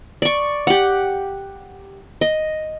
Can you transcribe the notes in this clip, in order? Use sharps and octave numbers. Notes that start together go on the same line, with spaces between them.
D5 C#6
G4 F#5
D#5